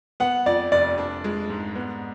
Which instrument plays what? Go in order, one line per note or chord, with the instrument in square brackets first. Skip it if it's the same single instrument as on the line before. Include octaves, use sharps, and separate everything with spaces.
[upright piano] B3 [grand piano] F#5
[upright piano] F2 [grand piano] D5
[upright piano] F1 [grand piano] D5
[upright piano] D4
G#3
G#2
B3